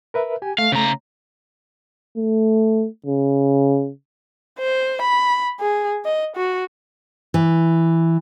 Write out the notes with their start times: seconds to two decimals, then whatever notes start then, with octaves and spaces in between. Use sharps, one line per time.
0.14 A#4 B4 E5
0.42 G4 G#5
0.58 A3 F5
0.72 C#3 A#5
2.17 A3
3.06 C#3
4.59 C5
5.02 B5
5.60 G#4
6.05 D#5
6.36 F#4
7.34 E3